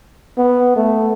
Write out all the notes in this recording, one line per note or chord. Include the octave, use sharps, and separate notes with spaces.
B3
A3